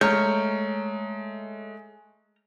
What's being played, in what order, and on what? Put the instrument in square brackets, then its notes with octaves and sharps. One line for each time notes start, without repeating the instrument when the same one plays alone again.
[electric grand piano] G#3 A3 [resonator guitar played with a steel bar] C#5 [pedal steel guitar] A#5 F6 G6